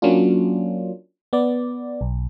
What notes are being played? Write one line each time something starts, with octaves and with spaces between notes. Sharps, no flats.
F#3 A#3 C#4 D4 F4
B3 D5
B1